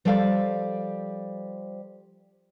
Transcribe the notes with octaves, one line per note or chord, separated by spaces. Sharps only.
F3 G3 A4 D5 F5